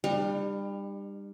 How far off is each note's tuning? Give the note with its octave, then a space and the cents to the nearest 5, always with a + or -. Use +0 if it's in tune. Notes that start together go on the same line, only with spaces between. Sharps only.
G3 +25 D#4 -45